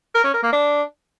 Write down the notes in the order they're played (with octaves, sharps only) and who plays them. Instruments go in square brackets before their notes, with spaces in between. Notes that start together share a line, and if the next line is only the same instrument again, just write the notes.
[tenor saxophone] A#4
C#4
A#4
A#3
D4